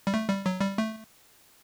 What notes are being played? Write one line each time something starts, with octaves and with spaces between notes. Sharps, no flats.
G3
A3
G3
F#3
G3
A3